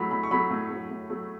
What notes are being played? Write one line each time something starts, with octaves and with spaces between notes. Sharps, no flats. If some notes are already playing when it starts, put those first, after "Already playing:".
Already playing: A2 F#3 A3 B5
A2 B5
C#6
F#3 A3 B5
A2
F#3 A3
A2
F#3 A3